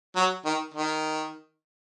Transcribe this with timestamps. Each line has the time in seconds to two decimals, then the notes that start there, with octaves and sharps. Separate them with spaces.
0.15 F#3
0.45 D#3
0.74 D#3